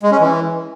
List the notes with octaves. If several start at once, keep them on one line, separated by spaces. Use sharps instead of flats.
G#3
C#4
E3